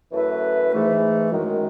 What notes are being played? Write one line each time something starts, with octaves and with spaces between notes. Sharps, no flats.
F#2 E3 A3 E4 B4
G#2 E3 A3
F#2 D#3 G#3